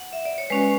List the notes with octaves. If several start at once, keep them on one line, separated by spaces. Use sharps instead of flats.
F#5
E5
D5
C#5
G#3 C#4 F#4 B4
B4